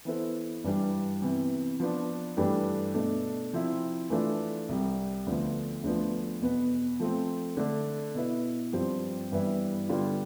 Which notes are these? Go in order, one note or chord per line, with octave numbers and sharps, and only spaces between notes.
E3 B3 E4 A4 C5
G2 E3 G3 D4
C3 E3 B3
F3 B3 D4
G2 E3 A3 D4 G4
B2 A3 D4
C3 F3 C4 E4
E3 A3 D4 F4 A4
C2 C3 G3
D2 D3 F3 B3
D2 D3 F3 B3
E2 B2 B3
F3 A3 C4
D3 A3 D4
B2 B3 E4
G2 F3 C4 G4 C5
G2 E3 G3 B3 E4
D3 G3 B3 F4